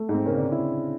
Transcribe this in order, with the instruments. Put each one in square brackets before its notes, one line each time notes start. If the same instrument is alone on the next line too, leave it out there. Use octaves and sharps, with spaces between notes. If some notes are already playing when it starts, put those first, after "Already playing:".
Already playing: [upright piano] A3
G#2
[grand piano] C4
[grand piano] C#3 C#4 [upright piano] A#3
[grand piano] D3 D4
E4